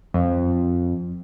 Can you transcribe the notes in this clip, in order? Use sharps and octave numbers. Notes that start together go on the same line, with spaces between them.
F2